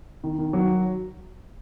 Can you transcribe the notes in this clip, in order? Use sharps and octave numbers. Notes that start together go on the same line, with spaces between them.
D#3
D#3
F#3